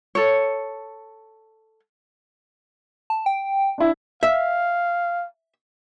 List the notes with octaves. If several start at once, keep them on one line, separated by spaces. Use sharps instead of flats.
A4 C#5
A5
G5
D4 E4
E5 F5